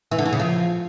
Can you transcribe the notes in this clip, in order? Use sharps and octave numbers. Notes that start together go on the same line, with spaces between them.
E3
D3
E3
C#3
F3